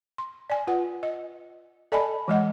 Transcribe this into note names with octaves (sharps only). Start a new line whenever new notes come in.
C6
D5 G#5
F4 B4 F#5
D#5
A4 D5 D#5 G#5 A5 B5
E3 G#3 D#5 F#5